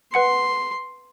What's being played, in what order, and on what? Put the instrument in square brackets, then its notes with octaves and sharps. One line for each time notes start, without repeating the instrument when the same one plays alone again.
[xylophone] B4 F#5 C#7 [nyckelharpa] C6